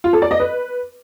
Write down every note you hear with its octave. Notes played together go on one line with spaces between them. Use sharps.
F4
A4
D5
D#5
B4